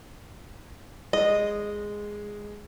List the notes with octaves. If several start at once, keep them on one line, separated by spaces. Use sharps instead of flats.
G#3 D#5